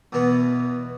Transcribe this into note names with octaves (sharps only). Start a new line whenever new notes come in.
E2 B2 E3 B3